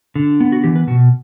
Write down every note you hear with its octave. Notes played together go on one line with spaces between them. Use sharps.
D3
B3
F#4
E3 G4
B4
B2 F#4